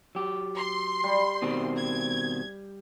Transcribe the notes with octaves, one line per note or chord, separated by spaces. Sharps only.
F#3 G4
C6
G3
B2 D#3 C4
G#6